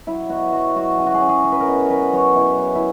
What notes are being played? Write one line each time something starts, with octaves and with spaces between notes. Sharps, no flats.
F#3 E4
B2 F#4
F#3 F#4
F#3 F#4
C#4 G#4
F#4
G#4
C#4
G#4
C#4
B4
A#4
B2
F#3 B4
F#3 C#5
B2 E4
B2
E4